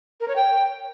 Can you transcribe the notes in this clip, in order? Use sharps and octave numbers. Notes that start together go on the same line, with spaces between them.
A#4
C#5
G5